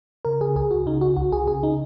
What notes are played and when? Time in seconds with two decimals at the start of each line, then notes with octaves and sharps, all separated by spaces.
0.25 C#3 A#4
0.41 C#3 G#4
0.56 C#2 G#4
0.71 C#2 F#4
0.86 C#3 D#4
1.01 C#3 F#4
1.16 C#2 F#4
1.32 C#2 G#4
1.47 C#3 G#4
1.63 C#3 D#4